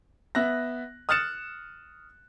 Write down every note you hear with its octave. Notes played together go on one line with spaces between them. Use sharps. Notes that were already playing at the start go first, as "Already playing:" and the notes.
B3 E5 F#6 A#6
D#6 F6 F#6 A6 C#7 E7